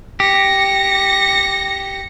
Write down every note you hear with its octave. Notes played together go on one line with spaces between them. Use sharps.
G4 A#6 C#7